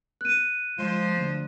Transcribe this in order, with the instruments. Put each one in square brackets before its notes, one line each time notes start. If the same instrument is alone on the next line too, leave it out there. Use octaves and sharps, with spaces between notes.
[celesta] F#6 D#7
[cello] F3 [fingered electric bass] G#3 [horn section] F4 C5
[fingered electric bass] D3 A3